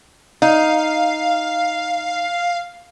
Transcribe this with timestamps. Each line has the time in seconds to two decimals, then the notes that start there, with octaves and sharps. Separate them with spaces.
0.42 D#4 F5